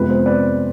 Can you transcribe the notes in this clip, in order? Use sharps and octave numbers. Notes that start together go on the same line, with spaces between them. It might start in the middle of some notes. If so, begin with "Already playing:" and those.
Already playing: F2 C3 G#3 B3 B4
C5
B4 D5